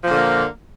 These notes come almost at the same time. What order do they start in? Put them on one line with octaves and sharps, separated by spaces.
F3 A#2 D3 A#3